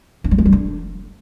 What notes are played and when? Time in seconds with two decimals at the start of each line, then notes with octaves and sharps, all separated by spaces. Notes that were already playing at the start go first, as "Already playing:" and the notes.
0.24 D4
0.31 G3
0.38 G#3
0.45 G3
0.52 D4